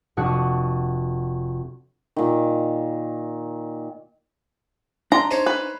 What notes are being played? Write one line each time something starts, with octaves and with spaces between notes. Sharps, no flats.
F1 D4 F#4 D#6 F#6
A#2 D#3
D4 A#5 C6
D#4 C5 C#5
B4